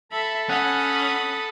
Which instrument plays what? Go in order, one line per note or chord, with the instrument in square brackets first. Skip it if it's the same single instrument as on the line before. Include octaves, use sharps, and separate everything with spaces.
[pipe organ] A4 [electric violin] E5 B5
[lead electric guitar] C#4 [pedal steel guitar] F#5 [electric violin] B5 D#6